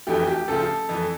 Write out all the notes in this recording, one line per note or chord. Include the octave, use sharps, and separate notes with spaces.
F1 F2 E3 A3 G4
G4
D2 C#3 F3 A4
F2 E3 A3